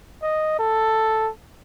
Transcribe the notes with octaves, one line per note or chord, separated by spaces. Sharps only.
D#5
A4